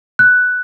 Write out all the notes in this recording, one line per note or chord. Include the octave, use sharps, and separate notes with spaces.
F#6